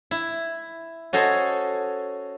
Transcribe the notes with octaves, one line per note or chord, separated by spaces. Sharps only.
E4
C#4 F#4 A4 C5 D#5 G#5